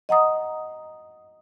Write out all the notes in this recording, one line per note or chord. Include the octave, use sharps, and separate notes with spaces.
D#5 F#5 A#5 D#6